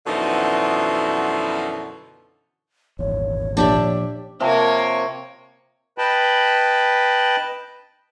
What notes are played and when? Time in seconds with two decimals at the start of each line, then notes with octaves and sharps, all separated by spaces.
0.06 F#2 B2 D3 E3 F3 D#4
2.99 D#1 G#1 E2 C#5
3.57 A#2 F3 D4 G4 E5
4.40 C3 F3 A#3 C#5
5.98 B4 D#5 G5 A5 B5